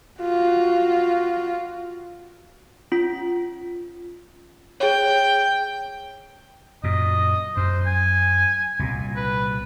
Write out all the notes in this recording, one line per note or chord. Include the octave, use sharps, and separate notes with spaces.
F4 F#4
C#4 F4 B6
G#4 C#5 G5
F#2 A#2 D#5
F#2 C5
G#5
C2 A#2
B4